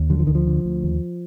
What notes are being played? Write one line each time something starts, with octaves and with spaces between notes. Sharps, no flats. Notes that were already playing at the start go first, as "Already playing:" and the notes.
Already playing: D#2
D3 F#3
F3
D2 D#3
F3
D3
D2
D#2